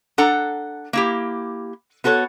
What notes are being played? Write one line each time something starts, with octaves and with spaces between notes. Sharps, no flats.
D4 A4 F#5 A#5
A#3 E4 G4
B3 F#4 A4 B4 C#5